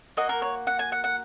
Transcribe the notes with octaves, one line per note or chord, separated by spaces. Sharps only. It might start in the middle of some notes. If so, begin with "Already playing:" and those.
A#3 F#4 D#5
A#4
C#5
F#5
G#5
F#5
F#5